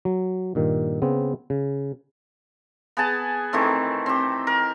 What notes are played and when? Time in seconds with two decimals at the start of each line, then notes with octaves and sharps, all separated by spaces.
0.05 F#3
0.55 G2 A#2 D#3
1.02 C#3 B3 C4
1.50 C#3
2.97 B3 G#4 G#5 A5
3.53 D#3 E3 A3 C4
4.06 C4 G4
4.47 A#4